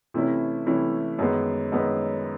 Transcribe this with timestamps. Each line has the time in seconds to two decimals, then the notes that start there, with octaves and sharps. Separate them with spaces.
0.14 C3 E3 A3 C#4 E4
0.66 C3 E3 A3 C#4 E4
1.19 F#2 D#3 G#3 B3
1.72 F#2 D#3 G#3 B3